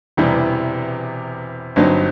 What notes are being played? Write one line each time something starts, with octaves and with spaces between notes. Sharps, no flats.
E1 E2 C3 E3 G3
G1 G2 F#3 C4 D#4